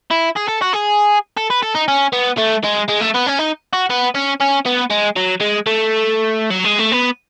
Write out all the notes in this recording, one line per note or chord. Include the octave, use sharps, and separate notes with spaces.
E4
G#4
A4
F#4
G#4
A4
B4
A4
D#4
C#4
B3
A3
G#3
G#3
A3
B3
C#4
D#4
F#4
B3
C#4
C#4
B3
G#3
F#3
G#3
A3
F#3
G#3
A3
B3